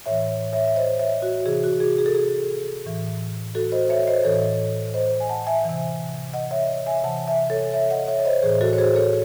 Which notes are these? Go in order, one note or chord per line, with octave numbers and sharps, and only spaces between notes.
A2 E3 C#5 E5
C#5 E5
E5
C5 D#5
C#5 E5
F#4
C3 E3 G#4
F#4
G#4
G#4
A4
G#4
A2 E3
F#4 A4
C5 D#5
C#5 E5
C5 D#5
A2 E3 A4 C#5
C5 D#5
G#5
F#5 A5
E5 G#5
C3 E3
D#5 F#5
C#5 E5
E5 G#5
C3 E3 F#5 A5
E5 G#5
A4 C#5
C#5 E5
D#5 F#5
C#5 E5
C#5
C5 D#5
A2 E3 G#4 C5
F#4 A4
C#5
G#4 C5
A4 C#5